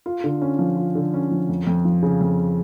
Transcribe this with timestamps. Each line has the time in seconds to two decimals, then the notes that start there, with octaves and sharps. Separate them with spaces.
0.06 F4
0.24 D3
0.42 C#4
0.59 F3
0.77 F4
0.95 D3
1.14 C#4
1.31 F3
1.49 F2
1.67 F2
1.85 F3
2.03 C#3
2.21 F2